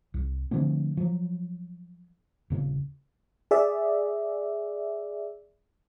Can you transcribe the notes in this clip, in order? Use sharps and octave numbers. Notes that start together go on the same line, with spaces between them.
C2
D3 F3 A3 C4
F3 F#3
D#1 C#3
G#4 D5 E5